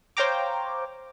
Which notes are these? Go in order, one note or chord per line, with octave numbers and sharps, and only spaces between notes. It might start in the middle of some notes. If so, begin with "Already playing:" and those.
C5 C#5 F5 G5 A#5 D6